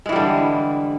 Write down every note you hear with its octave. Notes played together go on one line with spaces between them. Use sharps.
D3 E3 G3 G#3